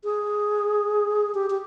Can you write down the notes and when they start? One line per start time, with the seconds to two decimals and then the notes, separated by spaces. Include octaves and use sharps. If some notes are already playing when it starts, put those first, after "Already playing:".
0.04 G#4
1.35 G4
1.50 G4